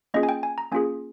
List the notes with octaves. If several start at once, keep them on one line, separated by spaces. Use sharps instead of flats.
A#3 C#4 F4 G#4 D#5
G#5
G5
G#5
A#5
A#3 C#4 F4 G#4 G#5